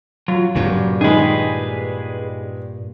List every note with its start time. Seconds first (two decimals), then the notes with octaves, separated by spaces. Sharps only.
0.28 F#3 F4
0.55 G2 A#2 C#3 F#3
1.01 D#3 G#3 G#4 B4